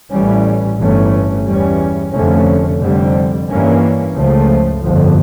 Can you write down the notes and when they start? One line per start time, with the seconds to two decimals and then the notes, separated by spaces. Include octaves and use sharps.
0.12 A1 A2 E3 G3 C#4
0.79 G1 G2 E3 A3 C#4
1.46 E2 E3 G3 C#4
2.13 F1 F2 D3 A3 C#4
2.81 F1 F2 D3 G3
3.49 G2 E3 A#3 C#4
4.15 C#2 C#3 F3 A3
4.83 G1 F2 D3 F3